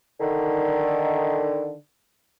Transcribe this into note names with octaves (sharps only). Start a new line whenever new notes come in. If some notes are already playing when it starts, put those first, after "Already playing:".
D3 D#3